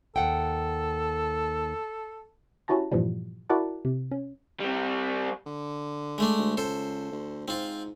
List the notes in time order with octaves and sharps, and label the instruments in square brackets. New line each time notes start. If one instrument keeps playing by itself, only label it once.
[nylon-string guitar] D#2 F#5 G5 [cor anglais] A4
[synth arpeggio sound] C#4 E4 F#4 G4 A5 A#5
G2 A#2 E3 F3 G3
E4 F#4 A#4 D5 F#5 A5
C3
C#4
[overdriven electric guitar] G3 C4
[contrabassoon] D3
[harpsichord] G#3 A3 D4
[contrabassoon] D2
[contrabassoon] C#2 [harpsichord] A4 C5
[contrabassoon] D2
[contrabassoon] G#2 [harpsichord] C4 F4